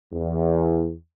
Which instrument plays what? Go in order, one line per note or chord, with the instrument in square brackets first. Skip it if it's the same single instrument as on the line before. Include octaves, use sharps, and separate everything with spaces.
[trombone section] E2